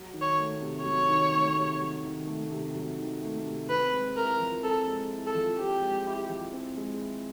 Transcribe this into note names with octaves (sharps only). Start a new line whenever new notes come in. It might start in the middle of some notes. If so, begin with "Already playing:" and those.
Already playing: F#3
D#3
C#5
A3
C3
F#3 C#5
D#3
A3
C3
F#3
D#3
A3
C3
F#3
D#3
A3
C3
C4 B4
G#3
E4 A#4
F3
C4 A4
G#3
E4
A4
F3
C4 G4
G#3
E4
F3
C4
G#3
E4